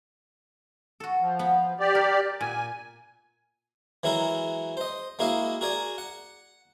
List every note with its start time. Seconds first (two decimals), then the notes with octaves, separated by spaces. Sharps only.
1.00 F#4 A4
1.21 F3
1.39 B3
1.80 G4 D5
1.95 A#4
2.41 A#2 G#5
4.03 E3 F#3 G#3 E4 F#4 A#4
4.77 C5 D#5
5.19 G#3 A#3 E4 F#4 D#5 F5
5.61 F#4 G#4 A#4 D5 G#5
5.98 F#5